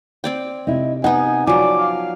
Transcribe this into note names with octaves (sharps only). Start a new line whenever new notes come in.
C4 D5 G5
C3 D#4 E4
B3 D#4 F#5 G#5
F3 F#3 D5 G#5 D6
F5